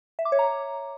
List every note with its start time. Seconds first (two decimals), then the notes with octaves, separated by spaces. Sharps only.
0.19 E5
0.25 D6
0.32 C#5
0.39 A#5